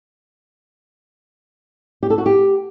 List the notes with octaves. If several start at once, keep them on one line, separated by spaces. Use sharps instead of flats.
G4
A4
F#4
G4